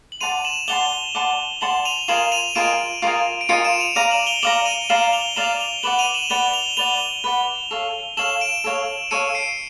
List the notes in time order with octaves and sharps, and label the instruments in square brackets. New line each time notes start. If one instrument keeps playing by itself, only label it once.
[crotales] F#7
[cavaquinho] D5 F#5 A5 C6 [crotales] D#7 F7
[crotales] E7 F#7
[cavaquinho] D5 F#5 A5 C6 [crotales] F7 G7
[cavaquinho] D5 F#5 A5 C6
[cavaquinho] D5 F#5 A5 C6 [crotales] E7 F#7
[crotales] D#7 F7
[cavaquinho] F4 A#4 D#5 G#5 [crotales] E7 F#7
[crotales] D#7 F7
[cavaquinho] F4 A#4 D#5 G#5 [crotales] D7 E7
[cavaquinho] F4 A#4 D#5 G#5
[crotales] D7
[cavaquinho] F4 A#4 D#5 G#5 [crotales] C#7 D#7
[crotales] D7 E7
D#7 F7
[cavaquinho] D5 F5 A#5 [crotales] D#7 F7
[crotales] E7 F#7
F7 G7
[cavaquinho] D5 F5 A#5 [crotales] E7 F#7
[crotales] D#7 F7
[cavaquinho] D5 F5 A#5 [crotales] E7 F#7
[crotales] F7 G7
[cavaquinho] D5 F5 A#5 [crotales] E7 F#7
[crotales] F7 G7
[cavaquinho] B4 D5 F#5 [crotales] E7 F#7
[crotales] D#7 F7
E7 F#7
[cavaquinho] B4 D5 F#5 [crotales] F7 G7
[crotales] F7 G7
[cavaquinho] B4 D5 F#5 [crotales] F7 G7
[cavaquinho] B4 D5 F#5
A4 C#5 F5
[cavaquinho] A4 C#5 F5 [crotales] E7 F#7
[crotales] D7 E7
[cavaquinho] A4 C#5 F5
[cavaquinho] A4 C#5 F5 [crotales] C#7 D#7
[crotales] C7 D7